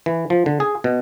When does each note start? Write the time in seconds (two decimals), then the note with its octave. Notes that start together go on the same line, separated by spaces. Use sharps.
0.06 E3
0.30 F3
0.46 D3
0.60 G#4
0.84 B2